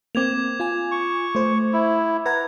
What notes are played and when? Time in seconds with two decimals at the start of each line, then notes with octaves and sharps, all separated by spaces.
0.15 A#3 C4 D6 G#6 F7
0.60 F4 G#5
0.91 C#6
1.35 A3 C5
1.73 E4
2.26 B4 F#5 A#5 G#6